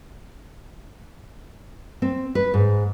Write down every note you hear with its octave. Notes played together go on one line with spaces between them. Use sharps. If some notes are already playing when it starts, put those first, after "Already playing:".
C4
B4
G#2